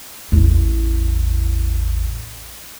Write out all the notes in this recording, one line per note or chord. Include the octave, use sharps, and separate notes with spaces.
A1 E2